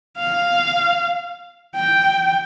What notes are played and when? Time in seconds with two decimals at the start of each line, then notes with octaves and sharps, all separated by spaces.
0.18 F5
1.75 G5